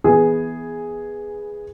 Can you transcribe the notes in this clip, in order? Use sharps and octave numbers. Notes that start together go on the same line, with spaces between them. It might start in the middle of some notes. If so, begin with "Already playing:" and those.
E3 B3 G#4